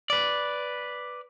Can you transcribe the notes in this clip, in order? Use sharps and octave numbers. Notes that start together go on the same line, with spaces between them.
B4 D5